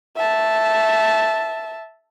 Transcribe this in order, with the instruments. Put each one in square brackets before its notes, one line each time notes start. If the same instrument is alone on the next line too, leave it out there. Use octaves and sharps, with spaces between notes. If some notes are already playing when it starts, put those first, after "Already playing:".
[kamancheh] E5 A5